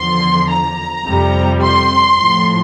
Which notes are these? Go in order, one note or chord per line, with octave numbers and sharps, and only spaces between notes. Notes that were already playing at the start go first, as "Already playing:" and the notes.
Already playing: E2 D3 F3 C6
A#5
F2 C3 G3
C6
A2 F3